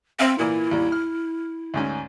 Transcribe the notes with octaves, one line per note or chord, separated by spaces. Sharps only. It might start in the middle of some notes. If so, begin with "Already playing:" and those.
C4 C5 E5 F5
A#2 E3 A#3 E4
D#2 G3
F6
D2 G#2 C#4